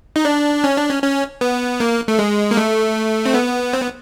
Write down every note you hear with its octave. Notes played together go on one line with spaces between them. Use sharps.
D#4
D4
C#4
D4
C#4
C#4
B3
A#3
A3
G#3
A#3
A3
C4
B3
C4
B3